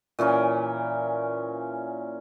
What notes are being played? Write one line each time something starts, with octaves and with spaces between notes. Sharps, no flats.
A#2 E3 C#4 A#4